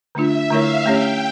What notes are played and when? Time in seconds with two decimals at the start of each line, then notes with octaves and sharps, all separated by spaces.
0.15 D3 A3 D4 F4 E5
0.50 D3 A3 E4 A#4 C#5 F5
0.85 A3 C#4 G4 C#5 G5